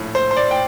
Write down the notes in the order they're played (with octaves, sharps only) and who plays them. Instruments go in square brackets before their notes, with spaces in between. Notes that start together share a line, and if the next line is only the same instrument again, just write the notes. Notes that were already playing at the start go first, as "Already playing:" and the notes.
Already playing: [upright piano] A#1 A2
C5
C5
D5
G5